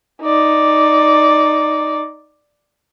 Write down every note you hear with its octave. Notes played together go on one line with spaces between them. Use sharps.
D#4 D5